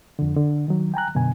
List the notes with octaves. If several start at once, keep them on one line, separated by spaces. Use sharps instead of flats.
F2 D3
D3
D#3 F#3
G5 G#5 A#5 F#6
F#2 B2 D3 G#5